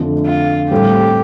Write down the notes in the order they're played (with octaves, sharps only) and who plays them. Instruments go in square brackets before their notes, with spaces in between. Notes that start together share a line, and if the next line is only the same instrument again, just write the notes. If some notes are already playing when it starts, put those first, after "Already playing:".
Already playing: [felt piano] F2 D3 A3 F4
[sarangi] F4
[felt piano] A2 G3 C4 A4 [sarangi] G4